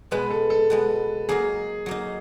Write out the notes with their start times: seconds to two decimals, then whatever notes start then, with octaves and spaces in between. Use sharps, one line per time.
0.11 B2 G#3 B3 B4
0.31 A4
0.50 A4
0.70 B2 G#3 B3
1.29 F#3 A#3 D#4 G#4
1.86 F#3 A#3 D#4